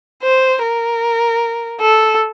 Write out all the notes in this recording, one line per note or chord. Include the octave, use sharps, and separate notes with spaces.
C5
A#4
A4